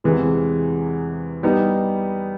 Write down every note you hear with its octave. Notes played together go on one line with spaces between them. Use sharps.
E2 C3 E3 G#3
G3 B3 D#4